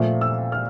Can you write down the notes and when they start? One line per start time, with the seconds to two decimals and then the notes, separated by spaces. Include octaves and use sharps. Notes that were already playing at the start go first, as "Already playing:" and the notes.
Already playing: A#2 F3 A3
0.21 E6
0.52 F6